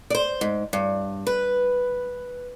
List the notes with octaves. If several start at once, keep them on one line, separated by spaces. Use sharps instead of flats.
C5 D5
G#2
G2
B4